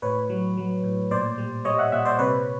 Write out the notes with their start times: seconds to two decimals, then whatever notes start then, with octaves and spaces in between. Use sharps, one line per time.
0.02 A2 B4 C#5
0.30 F#3
0.57 F#3
0.84 A2
1.11 A#2 C5 D5
1.38 G3
1.65 G3 C#5 D#5
1.78 E5 F#5
1.92 A#2 E5 F#5
2.05 C5 D5
2.19 C3 B4 C#5